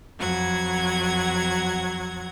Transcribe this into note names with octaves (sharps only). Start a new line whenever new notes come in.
F2 F#3 F#5 G#6